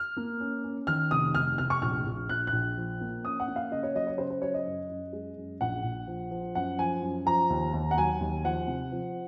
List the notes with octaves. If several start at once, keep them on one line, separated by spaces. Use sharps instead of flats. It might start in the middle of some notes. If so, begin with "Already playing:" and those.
Already playing: F6
A#3
C#4
C#4
D#3 F6
F1 D#6
F1 F6
F1 F6
C#6
A#1 F6
A#1
A#1 F#6
F#6
A#1
F3
A#3
C#4 D#6
F#5
A#3
F5
C#3 D#5
C#5
F#3 D#5
C#5
C#3 C5
C5
F#3 C#5
D#5
F#2
F#2
G#3
F#2
A#1 F#5
A#1
F3
F3
F#2 F#5
F3 G#5
F#2
F3 A#5
D#2
D#2
F#5
F#3 G#5
D#2
F3 F#5
C3
F3